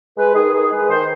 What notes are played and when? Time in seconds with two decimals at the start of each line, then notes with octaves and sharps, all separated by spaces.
0.16 G#3 B4
0.34 D#3 G#4
0.52 D#3 G#4
0.70 G#3 B4
0.89 D#3 C5